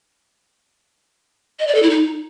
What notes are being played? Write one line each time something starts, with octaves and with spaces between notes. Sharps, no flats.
D#5
D5
A4
E4
D#4